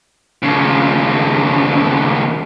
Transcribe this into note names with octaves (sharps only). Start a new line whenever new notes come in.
D#2 C#3